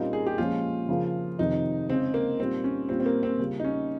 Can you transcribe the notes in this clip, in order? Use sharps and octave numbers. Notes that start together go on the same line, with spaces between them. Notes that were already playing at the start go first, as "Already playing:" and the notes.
Already playing: A#2 G3 A#3 C4 C#4 D#4 F4
G#4
G4
A#2 F3 G#3 C#4 F4
C#3 F3 A#3
F2 C3 D#3 D#4
C#3 G#3 C4 C#4
A#3
A#2 G3 A#3 C4 D#4
C#4
A#2 G3 C4 C#4 F4
C4
A#3
C4
C#3 G3 A#3 F4
D#4
C#4